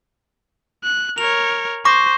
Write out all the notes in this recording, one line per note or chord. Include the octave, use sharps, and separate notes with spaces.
F#6
A#4 C#5 F7
C5 C#6 D6 A#6